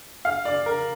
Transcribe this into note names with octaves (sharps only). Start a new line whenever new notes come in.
F5
D5
A#4